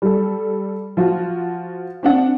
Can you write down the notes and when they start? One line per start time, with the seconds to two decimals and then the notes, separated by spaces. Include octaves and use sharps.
0.02 G3 A4
0.97 F3 F4 F#4
2.03 C4 D4 F#5